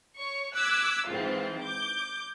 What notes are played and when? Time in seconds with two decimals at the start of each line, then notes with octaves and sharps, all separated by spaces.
0.17 C#5 C#6
0.55 D6 E6 F#6 G#6 B6
1.09 G#2 E3 C4 F4
1.62 D6 G6